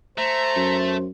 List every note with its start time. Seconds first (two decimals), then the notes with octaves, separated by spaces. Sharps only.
0.18 A3 C5 A#5
0.56 F#2